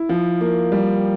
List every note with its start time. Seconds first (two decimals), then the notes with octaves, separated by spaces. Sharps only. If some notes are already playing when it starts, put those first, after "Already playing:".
Already playing: E4
0.09 F3
0.41 A#3
0.72 G3